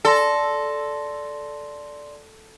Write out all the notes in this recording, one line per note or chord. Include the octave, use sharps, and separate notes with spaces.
A4 D5 C6 A#6